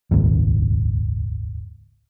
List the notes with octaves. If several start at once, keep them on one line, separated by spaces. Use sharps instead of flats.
D#1 G#1 C#2